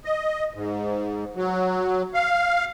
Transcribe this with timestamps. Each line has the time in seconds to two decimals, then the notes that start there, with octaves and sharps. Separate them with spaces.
0.05 D#5
0.54 G#2
1.36 F#3
2.14 F5